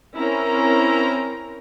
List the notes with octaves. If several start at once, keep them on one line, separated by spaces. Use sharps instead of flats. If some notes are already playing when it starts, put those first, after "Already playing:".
C4 C#4 E4 A#4 A#5